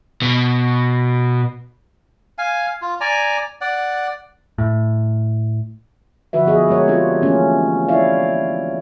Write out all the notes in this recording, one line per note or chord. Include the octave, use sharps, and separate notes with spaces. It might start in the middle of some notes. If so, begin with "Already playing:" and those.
B2
F5 G#5
F4
D5 G#5 A#5
D5 F#5
A2
D3 F3 F#4 B4 E5
F3 B3 G#4 D#5
F3 G#3 B3 A#4 C#5
F3 C4 D4 F4 G4 G#4
E3 A3 A#3 C#4
E4 C#5 D5 E5 F5